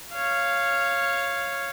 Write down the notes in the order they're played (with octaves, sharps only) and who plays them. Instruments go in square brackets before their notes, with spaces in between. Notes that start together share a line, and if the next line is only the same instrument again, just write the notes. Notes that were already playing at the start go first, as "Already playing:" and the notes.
[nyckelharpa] C#5 F5